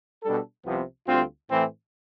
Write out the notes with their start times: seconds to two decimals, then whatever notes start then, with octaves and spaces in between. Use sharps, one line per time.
0.24 B2 G3 D4 A4
0.65 C2 C3 F3 B3
1.07 D2 D3 G3 C4 F4
1.50 A2 E3 A3 C4